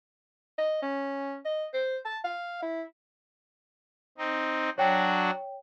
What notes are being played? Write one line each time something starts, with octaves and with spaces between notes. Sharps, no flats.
D#5
C#4
D#5
C5
A5
F5
E4
C4 D#4
F#3 D4 F#4 C#5 G5